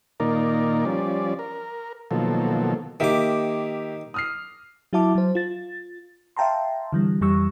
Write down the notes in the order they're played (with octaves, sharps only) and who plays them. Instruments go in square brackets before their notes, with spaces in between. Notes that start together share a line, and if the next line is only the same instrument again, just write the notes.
[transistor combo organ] A#2 D#3 A#3 D#4 A#4 D5
F3 G3 C#4 D5
A#4
B2 D#3 F3 F#3 A#3 A4
[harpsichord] D#3 D6 [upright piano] A#3 G4 E5
[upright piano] D#6 F6 C7
[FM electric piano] F#3 E4 F#4 E5 A5 D6
F#3 C5
F4 A6
E5 F5 G5 A5 A#5 C6
D3 E3 G3
F2 E3 G3 C#6 E6